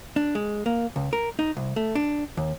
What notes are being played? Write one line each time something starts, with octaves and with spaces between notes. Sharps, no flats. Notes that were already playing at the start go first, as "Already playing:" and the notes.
D4
G#3
A#3
C#2
A#4
D#4
C2
A3
D4
D#2